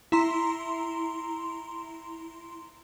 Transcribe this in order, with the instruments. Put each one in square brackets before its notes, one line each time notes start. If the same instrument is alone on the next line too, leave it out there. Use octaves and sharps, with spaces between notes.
[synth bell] E4 A#5 C6